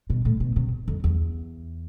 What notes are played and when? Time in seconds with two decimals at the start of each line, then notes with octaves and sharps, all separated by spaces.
0.10 B2
0.25 A2
0.40 B2
0.56 C3
0.88 F2
1.04 E2